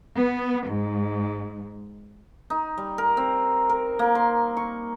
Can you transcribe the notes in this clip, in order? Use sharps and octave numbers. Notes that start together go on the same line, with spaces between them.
B3
G#2
D#4
G3
A#4
C4
A#4
A#3
C6
C#6